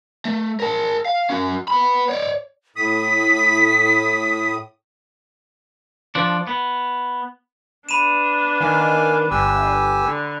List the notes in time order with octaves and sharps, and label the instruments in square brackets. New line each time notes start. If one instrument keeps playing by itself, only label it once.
[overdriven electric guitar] A3
A#4 A5
F5
C#4 F#4
B3 B5
C#5 D5
[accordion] A2 D#6 [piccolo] B6
[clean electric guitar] F3 D4
B3
[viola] B3 D4 [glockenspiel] B5 D#7 E7
[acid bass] D#3 [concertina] F5 G#5
[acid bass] G1 [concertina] G4 G#5 E6
[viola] D3